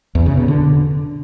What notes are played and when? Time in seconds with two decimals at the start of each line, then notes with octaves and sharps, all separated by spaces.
0.15 E2
0.26 C#3
0.37 B2
0.48 D3